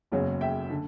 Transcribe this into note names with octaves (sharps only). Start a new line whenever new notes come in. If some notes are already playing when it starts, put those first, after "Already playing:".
F#1 E2 C#3 F#3 C#4
E5 G5
D3